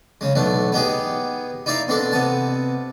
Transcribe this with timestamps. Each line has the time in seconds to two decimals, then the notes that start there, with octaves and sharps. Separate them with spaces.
0.21 C#3 G#3
0.36 B1 B2 A3 D4
0.72 B3 D#4 G4 G#4
1.66 D#4 E4 D5 F5 A#5
1.88 B2 C4 D4 A4
2.12 C3 B3 A5